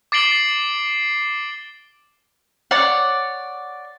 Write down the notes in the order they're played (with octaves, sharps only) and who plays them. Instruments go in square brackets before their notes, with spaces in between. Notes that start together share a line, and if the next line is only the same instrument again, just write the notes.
[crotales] D6 A6 C7 D7 F#7 G7
[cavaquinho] C#5 D5 F#5